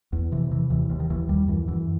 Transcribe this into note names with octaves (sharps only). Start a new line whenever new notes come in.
E2
C3 E3
C3 E3
D#2 E3
D#2
D#3
D#2 E3
D#2 G3
F#2 E3
F#2 E3